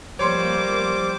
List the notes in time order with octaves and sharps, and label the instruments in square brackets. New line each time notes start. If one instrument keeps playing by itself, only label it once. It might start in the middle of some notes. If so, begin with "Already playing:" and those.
[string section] F3 A#3 [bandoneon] G3 C5 [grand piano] C#5 C6 [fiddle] D6